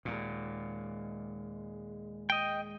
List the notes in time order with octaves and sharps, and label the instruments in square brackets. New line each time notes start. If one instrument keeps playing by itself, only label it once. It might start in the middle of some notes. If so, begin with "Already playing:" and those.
[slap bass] D#2 A#2 [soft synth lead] G#3
[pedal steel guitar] D#5 G5